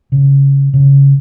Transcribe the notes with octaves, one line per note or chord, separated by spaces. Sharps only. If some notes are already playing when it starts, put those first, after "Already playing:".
C#3
C#3